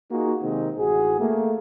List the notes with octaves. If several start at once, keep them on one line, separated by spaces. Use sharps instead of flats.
A#3 D#4 F4 F#4 G#4
C3 D#3 G#3 C4 D#4
A1 F#4 G#4
A3 A#3